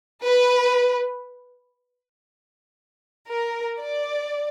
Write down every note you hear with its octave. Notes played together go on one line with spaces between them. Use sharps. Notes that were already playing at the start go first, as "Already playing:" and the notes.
B4
A#4
D5